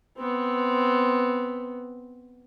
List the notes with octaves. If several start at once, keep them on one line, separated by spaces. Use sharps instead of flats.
B3 C4